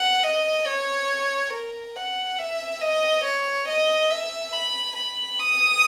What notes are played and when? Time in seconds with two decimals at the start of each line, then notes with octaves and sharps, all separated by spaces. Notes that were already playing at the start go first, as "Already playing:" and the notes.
Already playing: F#5
0.23 D#5
0.66 C#5
1.53 A#4
1.96 F#5
2.39 E5
2.81 D#5
3.24 C#5
3.68 D#5
4.10 E5
4.53 B5
4.97 B5
5.39 D#6